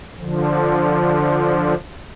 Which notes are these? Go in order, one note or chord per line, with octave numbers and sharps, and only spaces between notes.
D3 F3